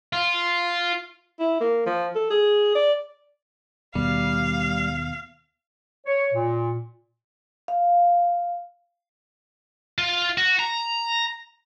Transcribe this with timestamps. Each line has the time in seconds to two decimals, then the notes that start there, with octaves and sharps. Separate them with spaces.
0.13 F4
1.39 E4
1.61 A#3
1.86 F3
2.15 A4
2.30 G#4
2.75 D5
3.95 D#2 B2 G3 F5
6.06 C#5
6.33 A#2
7.68 F5
9.98 F4
10.38 F#4
10.59 A#5